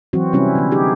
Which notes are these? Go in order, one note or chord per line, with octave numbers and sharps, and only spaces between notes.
E3 F#3 C4 F#4
C3 G3 C4 C#4 E4 B4
D3 B3
D#4 G4 G#4